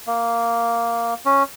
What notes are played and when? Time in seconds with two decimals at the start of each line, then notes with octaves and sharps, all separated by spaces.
0.07 A#3
1.25 C#4